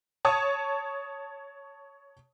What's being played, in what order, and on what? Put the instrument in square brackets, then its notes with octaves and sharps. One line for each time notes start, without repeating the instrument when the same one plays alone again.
[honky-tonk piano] C#5 A5 C#6 D#6